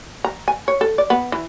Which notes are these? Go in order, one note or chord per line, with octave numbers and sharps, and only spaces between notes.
A#5
G#5
C#5
A4
D5
B3
E3